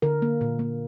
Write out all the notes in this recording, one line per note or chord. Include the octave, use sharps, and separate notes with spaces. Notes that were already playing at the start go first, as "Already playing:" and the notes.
D3 A#4
A#3
A#2
A#3